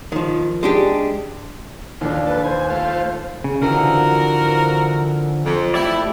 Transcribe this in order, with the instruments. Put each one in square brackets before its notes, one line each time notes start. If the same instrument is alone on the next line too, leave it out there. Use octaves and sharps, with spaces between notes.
[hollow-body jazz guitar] D#3 F3
G#3 D4 G4
[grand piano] D#2 D4 [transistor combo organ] A#2 D#3 F3
[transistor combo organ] A4 [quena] B4
[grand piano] D#2 [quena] C5 [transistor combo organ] G#5
[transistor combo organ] A3 F4
[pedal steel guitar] C#3
[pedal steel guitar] D3 E3 F3 [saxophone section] F#4 A#4
[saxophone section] F2
[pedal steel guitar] A3 G4 D5 [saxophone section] E4